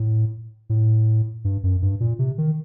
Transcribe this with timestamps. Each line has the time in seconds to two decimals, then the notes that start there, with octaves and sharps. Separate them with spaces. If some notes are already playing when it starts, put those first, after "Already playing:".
Already playing: A2
0.70 A2
1.45 G2
1.63 F#2
1.82 G2
2.00 A#2
2.19 C3
2.38 D#3